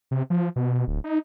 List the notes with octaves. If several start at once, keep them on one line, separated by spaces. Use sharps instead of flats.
C3
F3
B2
D1
D#4